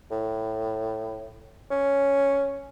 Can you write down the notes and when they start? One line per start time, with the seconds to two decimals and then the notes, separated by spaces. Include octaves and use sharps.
0.11 A2
1.71 C#4